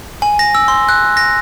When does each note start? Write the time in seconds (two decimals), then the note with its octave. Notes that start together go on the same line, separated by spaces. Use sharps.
0.22 G#5
0.39 A#6
0.55 E6
0.68 C6
0.89 F#6
1.17 A#6